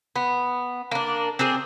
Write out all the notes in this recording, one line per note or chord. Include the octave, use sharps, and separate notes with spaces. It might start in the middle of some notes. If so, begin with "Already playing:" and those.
B3
A#3 D4
C4 D4 G#4